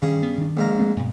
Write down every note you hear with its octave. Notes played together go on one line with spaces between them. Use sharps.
G2 D#3 C#4 G#4
B3
D#3 D4
A#1 G#2 A#4
G#3 A3 C4
G2 B2